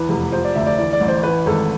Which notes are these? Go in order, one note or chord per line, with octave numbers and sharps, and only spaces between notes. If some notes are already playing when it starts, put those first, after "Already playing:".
Already playing: E2 E3 B4
F1
F3 C5
D5
D2 E5
D5
E3 D5
D5
A1
C5
E3 B4
G#1 A4